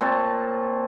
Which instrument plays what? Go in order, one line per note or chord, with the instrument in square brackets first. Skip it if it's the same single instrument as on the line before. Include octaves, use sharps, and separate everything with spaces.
[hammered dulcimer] A#2 C4 C#5 A5